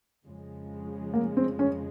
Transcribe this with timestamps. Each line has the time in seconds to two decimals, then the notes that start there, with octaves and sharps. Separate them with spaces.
0.24 F2 C#3 F3 G#3
1.14 A#3
1.37 C4
1.59 C#4